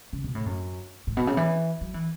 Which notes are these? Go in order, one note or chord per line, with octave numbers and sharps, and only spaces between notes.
C#3
B2
A2
F#2
A2
B2
C#3
E3
F#3
E3